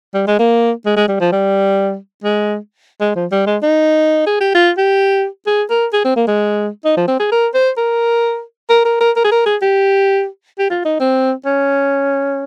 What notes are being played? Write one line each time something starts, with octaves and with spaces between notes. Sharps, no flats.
G3
G#3
A#3
G#3
G#3
G3
F3
G3
G#3
G#3
F3
G3
G#3
D#4
G#4
G4
F4
G4
G#4
A#4
G#4
C4
A#3
G#3
D#4
F3
C4
G#4
A#4
C5
A#4
A#4
A#4
A#4
A#4
G#4
A#4
G#4
G4
G4
F4
D#4
C4
C#4